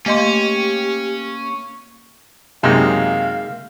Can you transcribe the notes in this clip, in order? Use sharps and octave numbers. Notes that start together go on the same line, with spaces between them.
A3 A#3 C#4 G4 D#5 C6
F#2 C3 G#3 A#3 D#4 F5